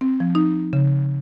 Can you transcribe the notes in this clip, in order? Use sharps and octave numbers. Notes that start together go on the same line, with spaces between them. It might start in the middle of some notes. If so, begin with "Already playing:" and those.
C4
F3
D#4
C#3